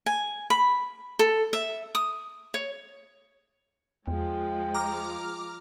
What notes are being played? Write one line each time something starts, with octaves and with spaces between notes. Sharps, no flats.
G#5
B5
A4
E5
D#6
C#5
E2 F3 G#3 G5
A#5 D6 F6